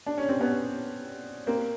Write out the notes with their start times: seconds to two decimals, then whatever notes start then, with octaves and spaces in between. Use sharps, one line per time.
0.06 D4
0.17 C#4
0.29 C4
0.40 B3 C#4
1.47 A#3 C4